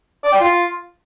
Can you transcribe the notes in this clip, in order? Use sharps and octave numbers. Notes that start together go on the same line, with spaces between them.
D5
G5
F4